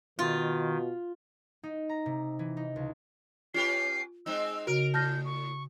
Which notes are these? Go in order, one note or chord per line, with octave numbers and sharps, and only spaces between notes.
B2 D#3 F4
D#4
A#5
C3
E3
D#4
C#2
C#4 F4 G4 B4 C7
G#3 C4 D#4 E6
C#3 F#4 A#4 D7
A2 A5 F6 G6 A#6
C#6